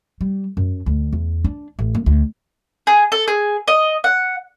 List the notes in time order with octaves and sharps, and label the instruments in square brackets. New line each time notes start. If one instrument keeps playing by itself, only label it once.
[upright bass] G3
F#2
D2
E2
D4
A1
A#3
D2
[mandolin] G#4
A4
G#4
D#5
F#5